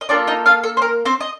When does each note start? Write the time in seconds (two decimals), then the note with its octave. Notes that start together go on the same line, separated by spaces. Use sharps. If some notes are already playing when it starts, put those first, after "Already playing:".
0.01 D#5
0.09 A#3 D4 F4 A4 D5
0.27 D#4 D#5
0.46 F4 F5
0.64 A4
0.77 C5
0.82 A#4
1.05 C4 C5
1.21 D#5